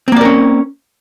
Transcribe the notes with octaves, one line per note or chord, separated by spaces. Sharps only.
A#3 C4 C#4 A#4 D5